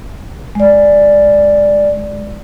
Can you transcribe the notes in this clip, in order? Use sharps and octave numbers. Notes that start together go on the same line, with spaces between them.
G#3 D5